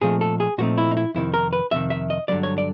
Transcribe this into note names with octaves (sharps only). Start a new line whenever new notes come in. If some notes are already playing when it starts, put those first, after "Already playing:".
A#2 F3 A3 C4 D#4 G#4
A4
G#4
A#2 F3 A3 C4 D#4 F#4
E4
D#4
E4
F2 C3 D#3 E4
A#4
B4
F2 C3 D#3 E5
E5
D#5
G2 D3 F#3 D5
C#5
D5